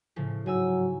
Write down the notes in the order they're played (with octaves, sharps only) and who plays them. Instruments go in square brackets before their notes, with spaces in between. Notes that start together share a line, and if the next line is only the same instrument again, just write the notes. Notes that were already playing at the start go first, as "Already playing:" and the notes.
[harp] A2 C#3 F3
[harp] G#2 G#5 E6 [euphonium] F#3